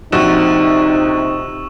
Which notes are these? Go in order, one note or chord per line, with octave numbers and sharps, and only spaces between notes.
A#1 C3 D#4 F#4 C#6 E6 E7